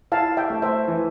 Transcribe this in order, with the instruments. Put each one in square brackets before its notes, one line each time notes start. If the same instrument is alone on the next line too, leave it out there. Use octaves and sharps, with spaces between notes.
[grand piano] E4 [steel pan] F5 A5
[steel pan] E5 G5
[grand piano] A3
[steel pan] C5 E5
[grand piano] E3